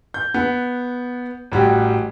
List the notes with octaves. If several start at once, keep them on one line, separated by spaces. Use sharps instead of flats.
G6
B3
A1 G3 F#4 G5